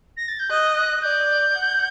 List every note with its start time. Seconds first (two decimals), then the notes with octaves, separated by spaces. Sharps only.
0.17 A#6
0.28 A6
0.39 G6
0.50 D#5 F#6
0.76 F#6
1.02 D5 G6
1.54 F#5